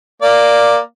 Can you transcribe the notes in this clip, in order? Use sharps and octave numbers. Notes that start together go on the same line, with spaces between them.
A#3 D5